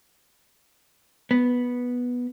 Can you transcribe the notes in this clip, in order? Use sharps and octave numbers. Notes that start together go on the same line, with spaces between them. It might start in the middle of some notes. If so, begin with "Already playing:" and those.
B3